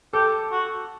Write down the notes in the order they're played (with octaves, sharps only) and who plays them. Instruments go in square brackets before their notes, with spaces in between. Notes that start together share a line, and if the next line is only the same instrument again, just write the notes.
[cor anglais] G4 [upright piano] A4
[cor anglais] F#4